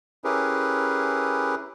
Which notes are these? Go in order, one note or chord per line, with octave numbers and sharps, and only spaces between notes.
C#4 E4 G4 G#4 A#4 B4